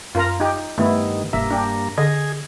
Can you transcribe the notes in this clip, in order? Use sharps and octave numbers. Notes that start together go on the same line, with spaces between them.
F#2 F4 A#4 A#5
D#4 G4
G2 D#3 A3 B3 E4
E1 G2 A#3 E5
D4 G4
D3 G#4 D#5